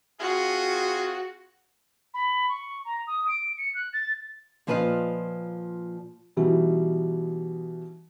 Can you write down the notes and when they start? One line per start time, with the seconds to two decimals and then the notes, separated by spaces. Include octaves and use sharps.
0.20 C4 F4 F#4 G#4
2.14 B5
2.49 C#6
2.85 A#5
3.07 D#6
3.28 D7
3.57 C#7
3.75 F#6
3.93 A6
4.67 A#2 F3 F4 B4 D#5 F5
6.37 B2 E3 G3 D#4